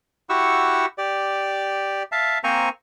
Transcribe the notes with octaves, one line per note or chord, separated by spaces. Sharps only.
E4 F#4 G4 F#5 C#6 E6
G4 D5
E5 F5 A5
A#3 C4 C5 G#5 A#5 C#6